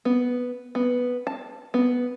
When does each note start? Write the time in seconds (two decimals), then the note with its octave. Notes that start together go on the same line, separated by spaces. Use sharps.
0.05 B3
0.75 B3
1.27 A5
1.74 B3